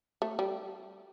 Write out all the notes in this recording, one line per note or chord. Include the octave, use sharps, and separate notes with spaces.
A3
G3